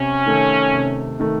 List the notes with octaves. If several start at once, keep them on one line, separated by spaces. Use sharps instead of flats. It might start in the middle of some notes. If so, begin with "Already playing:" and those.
Already playing: C3 C#4
D#3 A3
C3
D#3 A3